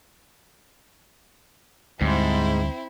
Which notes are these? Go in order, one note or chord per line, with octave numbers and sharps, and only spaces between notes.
D2 G#2 G3 C4 E4